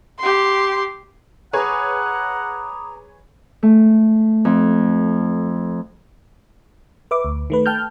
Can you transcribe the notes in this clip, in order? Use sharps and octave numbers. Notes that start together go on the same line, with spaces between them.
G4 C6
G#4 B4 C#5 F#5 A#5 B5 D6 D#6
A3
F2
B4 E5 D6
D2
D#3 A3 B4
G5 A5 F6 G6